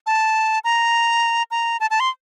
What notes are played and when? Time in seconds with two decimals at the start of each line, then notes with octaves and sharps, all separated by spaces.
0.06 A5
0.64 A#5
1.51 A#5
1.80 A5
1.90 A5
2.00 C6